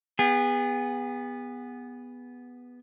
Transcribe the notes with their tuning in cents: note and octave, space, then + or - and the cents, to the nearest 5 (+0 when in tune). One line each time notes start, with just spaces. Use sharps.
B3 +0 G#4 -35